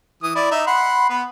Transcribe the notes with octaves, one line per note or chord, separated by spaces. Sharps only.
E3 D#6
E4 D5
D#4 E5
F#5 B5 C6
B3 B4